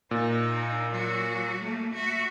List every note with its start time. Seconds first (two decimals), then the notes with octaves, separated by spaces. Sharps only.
0.11 A#2 D#4
0.90 F#3 F#4
1.61 A3 A#3
1.94 F#4 E5